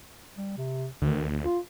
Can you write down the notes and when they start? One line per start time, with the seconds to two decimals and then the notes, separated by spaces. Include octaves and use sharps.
0.37 G3
0.57 C3
1.02 D2 D#3
1.43 F4